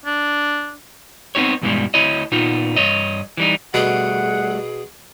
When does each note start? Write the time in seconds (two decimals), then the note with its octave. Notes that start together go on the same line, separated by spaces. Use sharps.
0.05 D4
1.35 B3 C4 D#4 G4 C#5
1.62 E2 G2 B2 E3 G3 G#3
1.94 D2 E4 C#5 D#5
2.32 A#2 B3 D#4 F4
2.76 G2 C#5 D#5
3.37 E3 G3 D#4
3.74 B2 G3 A3 G#4 F#5